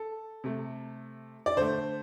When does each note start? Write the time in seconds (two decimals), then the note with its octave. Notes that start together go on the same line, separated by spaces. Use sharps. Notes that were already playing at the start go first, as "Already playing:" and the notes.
Already playing: A4
0.44 C3 A3
1.46 D5
1.56 D3 A3 C5